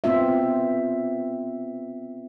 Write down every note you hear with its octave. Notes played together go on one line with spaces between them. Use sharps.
B3 C4 F4 E5